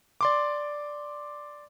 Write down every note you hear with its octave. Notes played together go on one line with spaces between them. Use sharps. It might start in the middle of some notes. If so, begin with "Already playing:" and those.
D5 C6 D6